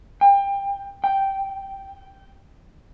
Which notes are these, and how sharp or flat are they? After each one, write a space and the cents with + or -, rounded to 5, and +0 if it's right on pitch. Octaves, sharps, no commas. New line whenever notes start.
G5 +25
G5 -5